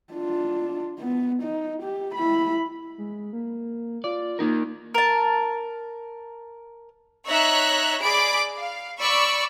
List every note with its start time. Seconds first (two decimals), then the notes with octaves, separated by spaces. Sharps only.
0.13 D4 F4
0.99 B3
1.42 D#4
1.83 G4
2.15 E4 B5
2.98 G#3
3.33 A#3
4.04 F4 D5
4.39 A#3 D#4 A#4
4.94 A#4 A5
7.27 D#4 C#5 E5 A#5 E6 F#6
8.01 G#4 D5 B5 D6 D7
8.57 F5
8.99 D5 B5 C#6 E6